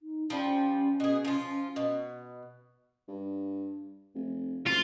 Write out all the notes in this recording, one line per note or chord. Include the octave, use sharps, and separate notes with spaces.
D#4
F3 G3 C#4
B2 G#4
F3 F4
B2
G2
F1
F#1 F4